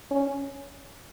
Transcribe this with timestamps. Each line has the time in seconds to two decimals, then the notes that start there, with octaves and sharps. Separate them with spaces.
0.11 C#4